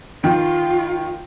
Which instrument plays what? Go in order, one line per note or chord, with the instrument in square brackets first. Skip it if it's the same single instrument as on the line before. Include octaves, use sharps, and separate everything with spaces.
[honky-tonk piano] D#3 [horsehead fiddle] F4